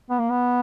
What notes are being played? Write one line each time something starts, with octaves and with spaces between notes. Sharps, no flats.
B3
A#3
B3